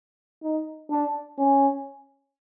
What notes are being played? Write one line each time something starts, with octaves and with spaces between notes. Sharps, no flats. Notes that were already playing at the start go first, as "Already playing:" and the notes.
D#4
D4
C#4